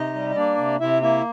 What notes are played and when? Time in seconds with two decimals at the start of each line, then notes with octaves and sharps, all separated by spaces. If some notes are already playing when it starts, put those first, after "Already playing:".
Already playing: C3 D#4 D#5
0.14 G3
0.30 D#5
0.35 A#3 D4 D5
0.57 C3
0.80 C3 E4 E5
1.02 A#3 E4 E5